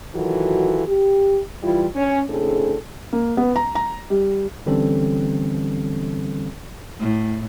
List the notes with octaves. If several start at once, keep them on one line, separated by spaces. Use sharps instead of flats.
D#3 E3 F#3 F4 F#4 A4
G4
E3 G3 E4 F4
C#4
A2 C#3 C4 D4 G#4 A4
A#3
B3
A#5
A#5
G3
D3 E3 G3 C4 C#4 A4
A2